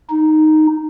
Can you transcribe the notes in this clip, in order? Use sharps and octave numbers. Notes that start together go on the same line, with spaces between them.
D#4